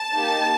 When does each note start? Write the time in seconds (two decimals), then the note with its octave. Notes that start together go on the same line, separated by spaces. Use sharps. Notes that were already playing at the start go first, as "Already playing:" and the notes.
Already playing: A5
0.13 A#3 D#4 G4